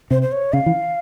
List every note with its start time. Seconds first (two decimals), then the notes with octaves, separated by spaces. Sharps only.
0.11 C3 C5
0.22 C5
0.32 C#5
0.53 C#3 F5
0.66 E3